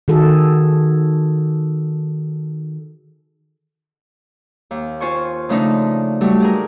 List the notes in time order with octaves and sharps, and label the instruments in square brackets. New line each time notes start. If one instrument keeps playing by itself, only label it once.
[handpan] D#3 F#4 G#4 A4
[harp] D#2
F4 C5 G#5 C#6
C#3 F3 A3 D4 D#4
F#3 G3 A3
G4 G#4 A#4